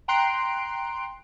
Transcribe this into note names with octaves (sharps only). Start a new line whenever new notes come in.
G5 A#5 C6 F#6 C7 D7